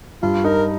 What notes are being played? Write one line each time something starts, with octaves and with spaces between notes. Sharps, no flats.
G2 F4
D#4 A#4